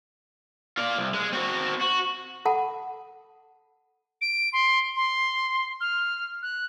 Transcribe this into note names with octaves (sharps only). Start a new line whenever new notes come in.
F4 D5
C2
G#3
C4 F#4
F#4
A4 F#5 A5 B5
D7
C6
C6
F6
F#6